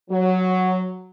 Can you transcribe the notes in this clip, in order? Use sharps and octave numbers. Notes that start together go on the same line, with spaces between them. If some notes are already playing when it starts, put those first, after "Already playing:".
F#3